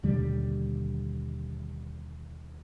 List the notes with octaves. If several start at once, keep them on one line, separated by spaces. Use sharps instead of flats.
D#2 B2 D3 G3